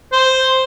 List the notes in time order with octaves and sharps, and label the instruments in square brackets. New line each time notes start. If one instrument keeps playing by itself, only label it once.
[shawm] C5